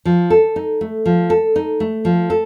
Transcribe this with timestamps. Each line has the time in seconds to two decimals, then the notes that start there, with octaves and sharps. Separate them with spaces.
0.05 F3
0.30 A4
0.56 D#4
0.81 A3
1.05 F3
1.30 A4
1.56 D#4
1.80 A3
2.05 F3
2.30 A4